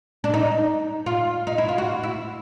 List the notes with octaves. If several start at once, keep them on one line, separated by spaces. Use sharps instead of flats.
D4
D#4
F4
D#4
E4
F4
F#4
E4